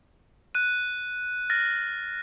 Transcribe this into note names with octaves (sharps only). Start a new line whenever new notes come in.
F#6 D#7
F6 A6 A#6